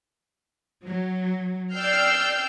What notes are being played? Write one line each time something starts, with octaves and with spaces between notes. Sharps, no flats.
F#3
D5 G5 E6 F6 G6 C7